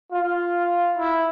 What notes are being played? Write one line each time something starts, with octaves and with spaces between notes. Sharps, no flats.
F4
E4